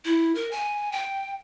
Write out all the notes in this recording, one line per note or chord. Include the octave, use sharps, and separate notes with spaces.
E4
A#4
G#5
G5